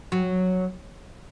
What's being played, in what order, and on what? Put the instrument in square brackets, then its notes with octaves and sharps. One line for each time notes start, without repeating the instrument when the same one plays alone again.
[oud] F#3